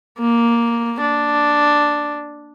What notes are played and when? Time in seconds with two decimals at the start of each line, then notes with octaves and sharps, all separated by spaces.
0.19 A#3
1.01 D4